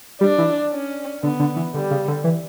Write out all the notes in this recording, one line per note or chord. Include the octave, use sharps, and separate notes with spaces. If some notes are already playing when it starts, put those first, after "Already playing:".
G3 D4
E3
C#4
D3 B3
D3
E3
D3 G3
C#3
D3
E3